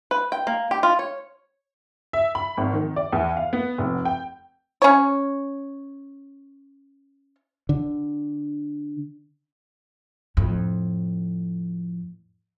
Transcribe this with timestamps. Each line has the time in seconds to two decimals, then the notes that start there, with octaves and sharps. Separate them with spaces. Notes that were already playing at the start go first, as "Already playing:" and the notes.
0.11 B4
0.32 G5
0.47 A#3
0.71 G4
0.83 F4
0.99 C#5
2.13 E5
2.35 B5
2.57 G#1
2.74 D#3
2.96 D5
3.13 E2
3.37 F5
3.53 B3
3.78 F1
4.05 G5
4.82 C#4 C#5
7.69 D3
10.37 F2 A2